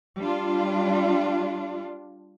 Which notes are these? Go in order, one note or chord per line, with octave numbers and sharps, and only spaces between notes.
G3 D4 F4